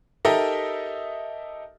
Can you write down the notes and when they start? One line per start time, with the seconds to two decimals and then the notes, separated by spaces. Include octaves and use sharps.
0.25 D#4 G4 A4 A#4 D#5 E5